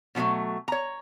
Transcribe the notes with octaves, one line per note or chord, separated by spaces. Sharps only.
B2 D#3 F3 F#3 A3
C#5 A#5